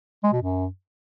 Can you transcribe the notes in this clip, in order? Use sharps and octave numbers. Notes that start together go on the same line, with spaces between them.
G#3
B2
F#2